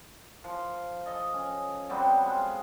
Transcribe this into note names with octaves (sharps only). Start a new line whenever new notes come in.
F3
A4 D#5
C#4
F#3 G3 B3 C4
G#3 F5